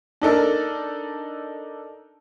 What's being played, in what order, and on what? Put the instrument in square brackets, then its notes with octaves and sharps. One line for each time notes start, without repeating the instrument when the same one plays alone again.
[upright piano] D4 D#4 A4 A#4